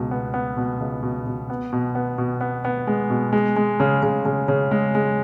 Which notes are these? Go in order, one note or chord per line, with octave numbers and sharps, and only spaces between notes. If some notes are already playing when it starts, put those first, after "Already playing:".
Already playing: C#2 B2
B3
B3
B2
C#2
B2
B2
B3
B2
B3
B2
B3
B3
G#3
B2
G#3
G#3
C#3
C#3
C#3
C#3
G#3
G#3